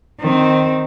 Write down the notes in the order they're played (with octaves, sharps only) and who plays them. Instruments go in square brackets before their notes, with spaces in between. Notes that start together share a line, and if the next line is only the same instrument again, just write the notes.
[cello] D#3 C4